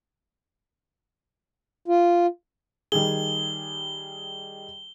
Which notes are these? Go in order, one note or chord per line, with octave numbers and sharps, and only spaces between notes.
F4
D#3 G3 G#4 G7